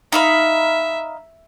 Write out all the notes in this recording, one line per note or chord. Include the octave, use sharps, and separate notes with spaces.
D#4 E5 F5 B5